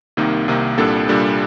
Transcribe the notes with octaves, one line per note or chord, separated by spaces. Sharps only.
C2 C3 D#3 A#3 D#4
C2 C3 D#3 A#3 D#4
C2 A#2 G3 D4 A4
C2 A#2 G3 D4 A4